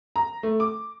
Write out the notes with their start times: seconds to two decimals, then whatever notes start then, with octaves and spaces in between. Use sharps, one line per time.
0.16 A#5
0.43 A3
0.60 D6